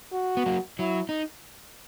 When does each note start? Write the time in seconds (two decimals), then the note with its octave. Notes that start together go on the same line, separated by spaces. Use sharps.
0.13 F#4
0.37 B3
0.46 F#3 A#3
0.79 F#3 E4
1.09 D#4